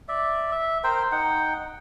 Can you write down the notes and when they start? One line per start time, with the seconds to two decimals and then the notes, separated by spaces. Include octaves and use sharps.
0.08 D5 E5
0.52 E5
0.84 A#4 C5 G5
1.12 D#4 F#5 G5